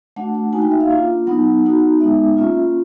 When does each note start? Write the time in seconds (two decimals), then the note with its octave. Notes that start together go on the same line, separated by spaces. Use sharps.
0.16 A3 D4 F#4 F#5
0.35 F#5
0.53 A#3 D#4 F#4 G#5
0.62 G5
0.71 E5
0.81 F5
0.89 A#3 D4 F4
1.27 F#3 B3 D#4 F#5
1.63 B3 D#4 F#4
2.00 G#3 B3 D#4 E5
2.37 A#3 C#4 F4